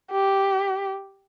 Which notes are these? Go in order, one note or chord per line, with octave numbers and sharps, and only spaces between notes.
G4